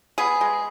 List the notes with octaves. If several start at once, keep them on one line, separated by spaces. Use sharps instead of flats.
B3 G#4
G#3